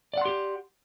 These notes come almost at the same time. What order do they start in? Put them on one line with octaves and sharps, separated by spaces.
D5 F#5 C6 G4